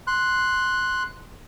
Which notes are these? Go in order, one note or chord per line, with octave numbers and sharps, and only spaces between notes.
C6 F#6